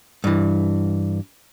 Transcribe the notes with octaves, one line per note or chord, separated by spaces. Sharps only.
G2 E3